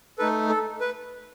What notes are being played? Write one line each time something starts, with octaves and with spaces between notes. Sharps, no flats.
A3 D#4 A4 B4
A4
B4